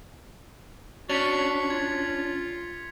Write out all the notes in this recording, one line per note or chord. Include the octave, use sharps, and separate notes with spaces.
C#4 D4 F#4 B6 C#7 F7
F4 G#6